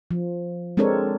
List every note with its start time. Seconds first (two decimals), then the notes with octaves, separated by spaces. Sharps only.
0.11 F3
0.77 G#3 C4 D4 A4 A#4 C#5